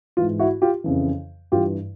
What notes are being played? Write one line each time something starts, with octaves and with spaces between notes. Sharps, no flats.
G#2 E3 F4
E4 F#4
F4 G4
F2 C#3 E3
G2 E3 F4 G4